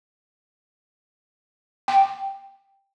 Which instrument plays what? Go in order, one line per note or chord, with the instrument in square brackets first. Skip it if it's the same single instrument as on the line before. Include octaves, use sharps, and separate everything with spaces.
[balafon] G5